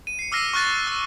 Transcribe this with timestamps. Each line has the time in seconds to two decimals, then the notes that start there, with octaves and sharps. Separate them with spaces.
0.07 D#7
0.19 C7 C#7
0.32 D6 E6 F6 A#6 C7 D#7
0.53 C#6 F6 F#6 A6
0.87 E6